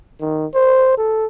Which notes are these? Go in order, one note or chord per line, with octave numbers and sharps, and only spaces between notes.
D#3
C5
A4